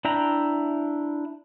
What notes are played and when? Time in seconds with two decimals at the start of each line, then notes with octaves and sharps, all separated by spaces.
0.05 D4 E4 G5 A#5